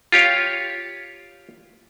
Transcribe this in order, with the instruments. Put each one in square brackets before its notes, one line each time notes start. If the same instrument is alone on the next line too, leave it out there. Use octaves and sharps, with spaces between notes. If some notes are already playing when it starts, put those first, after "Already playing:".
[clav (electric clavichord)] F4 G4 C#5 F5